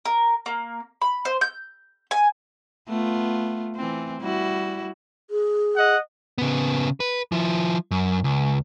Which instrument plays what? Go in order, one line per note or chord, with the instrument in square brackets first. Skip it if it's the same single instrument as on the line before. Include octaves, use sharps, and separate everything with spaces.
[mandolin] A#4
A#3
B5
C5
G6
G#5
[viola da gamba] A3 B3 F4
E3 C4
G3 E4 F#4
[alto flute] G#4
[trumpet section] D#5 F#5
[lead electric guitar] C#3 B3
B4
F3 E4
F#2
C#2